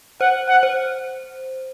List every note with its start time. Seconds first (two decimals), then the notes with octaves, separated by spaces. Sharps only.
0.21 C5 F#5
0.48 F#5
0.63 C5